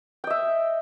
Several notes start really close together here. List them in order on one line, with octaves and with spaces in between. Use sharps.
G5 D#5 E5